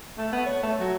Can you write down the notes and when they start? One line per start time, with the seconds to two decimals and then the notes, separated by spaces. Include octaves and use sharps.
0.18 A3
0.33 B3
0.46 C#5
0.63 A3
0.80 F#3